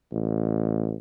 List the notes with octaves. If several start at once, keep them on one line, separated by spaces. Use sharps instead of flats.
A1